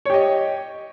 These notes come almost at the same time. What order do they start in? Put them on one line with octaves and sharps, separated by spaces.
C#5 G4 D#5